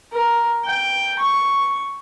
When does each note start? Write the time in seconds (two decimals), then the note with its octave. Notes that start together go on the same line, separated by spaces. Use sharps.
0.13 A#4
0.65 G5
1.19 C#6